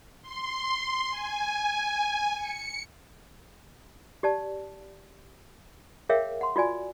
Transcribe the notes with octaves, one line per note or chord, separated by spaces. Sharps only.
C6
G#5
C#7
G4 D5 A5
G#4 A#4 C#5 E5 F5 G5
F#5 C6
F4 F#4 D5 G#5